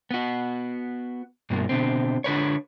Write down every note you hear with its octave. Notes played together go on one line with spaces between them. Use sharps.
B3 F#4
G2 B2 A#3
B2 D3 C4
D3 B4 C#5